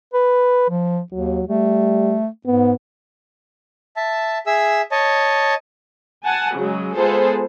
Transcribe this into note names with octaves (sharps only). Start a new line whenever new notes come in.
B4
F3
D#2 F#3
G3 A3
G#2 B3
E5 A5
G#4 E5 E6
C#5 D#5 A5
F#5 G#5 A5
C#3 F#3 G#3
G#3 B3 F4 G#4 A4 C5